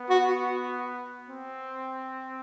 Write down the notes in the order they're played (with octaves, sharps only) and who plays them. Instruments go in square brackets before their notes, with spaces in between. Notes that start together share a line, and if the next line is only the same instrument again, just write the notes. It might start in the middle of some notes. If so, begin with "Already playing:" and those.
Already playing: [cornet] B3
[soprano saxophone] F#4
[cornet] C4